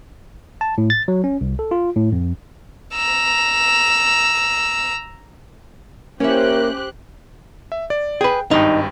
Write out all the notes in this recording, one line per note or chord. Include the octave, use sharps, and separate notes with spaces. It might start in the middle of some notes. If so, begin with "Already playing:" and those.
A5
A2
A6
F#3
C#4
C2
A4
F4
A2
F2
A#5 E6
A#3 C#4 E4 G4 A#4 C5 E5 F#6
E5
D5
G#4 B4 G5
G#1 G2 D#4 G5